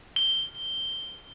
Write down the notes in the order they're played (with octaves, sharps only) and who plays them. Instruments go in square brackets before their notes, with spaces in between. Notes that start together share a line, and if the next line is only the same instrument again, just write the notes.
[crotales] G7